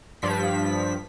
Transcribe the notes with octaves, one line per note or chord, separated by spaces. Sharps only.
G2 F3 B6